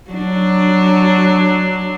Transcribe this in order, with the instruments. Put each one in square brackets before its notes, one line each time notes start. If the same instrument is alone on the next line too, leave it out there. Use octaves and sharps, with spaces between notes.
[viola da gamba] F#3 D4